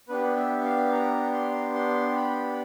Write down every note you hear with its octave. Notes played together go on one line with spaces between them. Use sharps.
B3 D4 G4 B4
E5
F5
A#5
C6
C6
B5